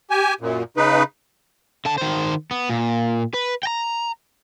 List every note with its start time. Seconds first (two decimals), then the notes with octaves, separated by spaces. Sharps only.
0.10 G4 G#5
0.41 F#2 A#2
0.77 C#3 D#4 B4
1.85 D3 A5
1.98 D#3 C5
2.51 B3
2.70 A#2
3.34 B4
3.63 G5 A#5